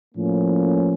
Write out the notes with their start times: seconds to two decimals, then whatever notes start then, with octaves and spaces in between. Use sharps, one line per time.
0.15 A2 F3 A#3 C#4